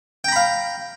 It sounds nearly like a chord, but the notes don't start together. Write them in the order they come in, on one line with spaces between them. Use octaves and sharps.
G5 A#5 B5 F5